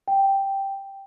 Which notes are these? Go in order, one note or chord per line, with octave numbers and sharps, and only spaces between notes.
G5